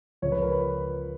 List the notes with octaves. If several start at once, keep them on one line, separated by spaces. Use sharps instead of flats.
C#2 C#3 F3 C#5
B4
A#4
B4